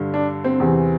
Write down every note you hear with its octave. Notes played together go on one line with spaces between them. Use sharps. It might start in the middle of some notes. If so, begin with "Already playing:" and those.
Already playing: G2 D3
D4
C4
E2 C3 E3